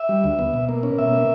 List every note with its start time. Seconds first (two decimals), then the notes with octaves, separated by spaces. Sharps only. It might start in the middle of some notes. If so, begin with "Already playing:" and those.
Already playing: E5
0.09 G3
0.24 D2
0.39 B3
0.54 B2
0.69 A#3
0.83 C#4
0.98 B2 E5
1.13 A#3